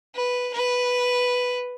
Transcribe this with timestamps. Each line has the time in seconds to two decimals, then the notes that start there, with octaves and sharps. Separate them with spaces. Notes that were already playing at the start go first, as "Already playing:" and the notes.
0.15 B4
0.53 B4